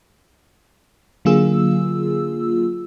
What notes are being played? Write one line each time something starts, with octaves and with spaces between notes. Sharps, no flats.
D3 F#3 A#3 F4 G#4 E6